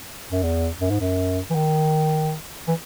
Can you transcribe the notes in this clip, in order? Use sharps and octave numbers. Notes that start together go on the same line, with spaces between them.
F#2
E2
F#2
G#2
F#2
E3
D#3
E3